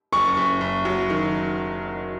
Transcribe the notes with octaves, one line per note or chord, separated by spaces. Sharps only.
F#1 C#6
F#1
F#1
F#3
D#3